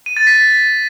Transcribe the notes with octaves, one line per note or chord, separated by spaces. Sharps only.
D#7
A6
B6